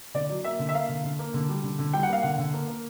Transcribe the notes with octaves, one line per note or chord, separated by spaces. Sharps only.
D3 D5
F#3
A#3 E5
D3
E5
A#3 F5
D3
D3
A#3
D3
G3
D3
D3
G3 G5
F#5
A#3 F5
D3 F#5
D3
A#3
A#3